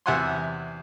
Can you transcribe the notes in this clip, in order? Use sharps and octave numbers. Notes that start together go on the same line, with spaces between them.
E2 C3 E5 F#5 G#5 C6